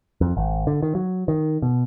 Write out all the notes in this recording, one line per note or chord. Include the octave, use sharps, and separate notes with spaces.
F2
G#1
D3
D#3
F#3
D#3
B2